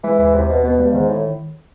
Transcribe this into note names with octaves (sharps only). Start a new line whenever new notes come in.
E3 G#3
D#2 E3
D#2 C3
D#2 B2
B2 B3
G2 G#3
G#2 D#3
A2